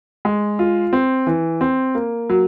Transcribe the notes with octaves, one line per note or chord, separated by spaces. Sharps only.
G#3
F4
C4
E3
C4
A#3
F#3